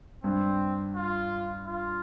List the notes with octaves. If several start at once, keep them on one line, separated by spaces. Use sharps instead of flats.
G2 C4
F4
F4